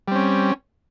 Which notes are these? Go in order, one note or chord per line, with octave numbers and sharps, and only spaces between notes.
G3 C4 C#4